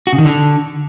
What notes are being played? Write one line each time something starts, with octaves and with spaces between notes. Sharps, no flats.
F#4
C#3
D#3
D3